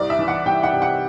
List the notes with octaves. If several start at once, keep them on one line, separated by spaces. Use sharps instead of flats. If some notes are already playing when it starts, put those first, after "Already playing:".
Already playing: C2 D5
E5
E3
F#5
C2 G5
F#5
C3
F#5